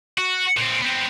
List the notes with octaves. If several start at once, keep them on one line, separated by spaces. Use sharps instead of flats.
F#4
A#2 C4
B3 C4